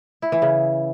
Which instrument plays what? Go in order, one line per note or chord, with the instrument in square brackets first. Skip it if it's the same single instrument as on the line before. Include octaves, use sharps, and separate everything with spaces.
[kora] E4
E3
C#3